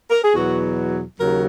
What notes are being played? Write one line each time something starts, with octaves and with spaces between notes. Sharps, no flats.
A#4
G#4
E2 B2 F#3 F#4
D#2 C#3 F#3 A#4